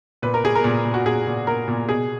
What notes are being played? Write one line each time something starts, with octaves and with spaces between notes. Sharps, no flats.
A#2 B4
A#4
A#2 G#4
A#4
A#2
A#2
F#4
A#2 G#4
A#2
A#2 A#4
A#2
B2 G#4